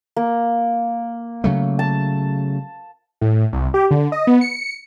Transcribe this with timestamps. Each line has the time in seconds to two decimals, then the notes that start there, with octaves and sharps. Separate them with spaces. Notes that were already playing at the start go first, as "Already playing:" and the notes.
0.16 A#3
1.44 C#3 F#3 A3
1.79 A5
3.21 A2
3.53 C2
3.74 G4
3.91 D3
4.12 D#5
4.27 B3
4.41 C#7